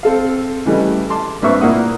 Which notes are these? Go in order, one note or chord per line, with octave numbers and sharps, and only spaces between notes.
C4 A4 F5
C#3 E3 G3 A3 D#5
A5 C6 D6
G2 A#3 C4 B4 E5 C#6
A#2 A#3 E4 F#5 D#6